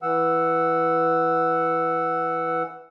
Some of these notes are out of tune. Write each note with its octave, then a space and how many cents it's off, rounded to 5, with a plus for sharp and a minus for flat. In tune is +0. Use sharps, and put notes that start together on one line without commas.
E3 +0 F#5 +0 E6 +0